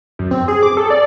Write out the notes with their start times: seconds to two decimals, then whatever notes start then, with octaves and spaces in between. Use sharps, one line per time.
0.19 F#2
0.31 C4
0.48 G#4
0.63 D6
0.77 A4
0.90 D5